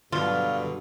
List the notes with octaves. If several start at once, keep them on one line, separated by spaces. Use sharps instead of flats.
G2 B2 D3 F#3 F4